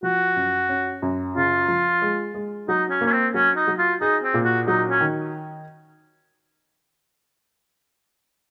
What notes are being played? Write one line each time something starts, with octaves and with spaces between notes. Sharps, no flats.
F3 F#4
F#2
C#4
F#2
C#3 F4
F3
G#3
G#3
F#3 D#4
C#4
A#3 C#4
C4
F#3 C#4
D#4
F#3
F4
D#4 G#4
C4
A#2
F#4
F#3 D#4
C#4
D#3